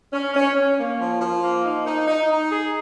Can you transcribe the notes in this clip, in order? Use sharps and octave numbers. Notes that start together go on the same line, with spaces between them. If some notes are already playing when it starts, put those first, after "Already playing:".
C#4
C#4
C#4
A#3
F3
F3
A#3
D#4
D#4
D#4
D#4
G#4